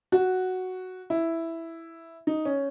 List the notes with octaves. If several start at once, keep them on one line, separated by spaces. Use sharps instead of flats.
F#4
E4
D#4
C#4